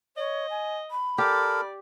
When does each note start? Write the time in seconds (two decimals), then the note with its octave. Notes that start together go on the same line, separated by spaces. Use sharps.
0.17 C#5 D#5
0.50 G#5
0.91 B5
1.18 G4 A4 A#4 D5